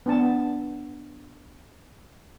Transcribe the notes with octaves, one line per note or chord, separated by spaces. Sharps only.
B3 D4 A5